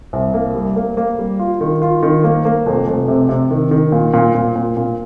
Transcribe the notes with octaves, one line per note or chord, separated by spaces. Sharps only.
C2
A#3
G3
A#3
A#3
G3
F4
D#3
F4
D#3
A#3
A#3
F1
F1
C3
C3
D#3
D#3
A#2
A#2
A#2
A#2
A#2